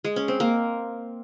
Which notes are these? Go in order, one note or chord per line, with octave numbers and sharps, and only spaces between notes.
G#3
C#4
C4
A#3